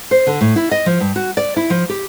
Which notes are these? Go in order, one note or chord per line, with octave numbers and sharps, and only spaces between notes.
C5
D3
A2
E4
D#5
F3
G2
F#4
D5
E4
F3
G4